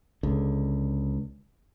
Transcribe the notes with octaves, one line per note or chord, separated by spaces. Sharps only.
C#2 D3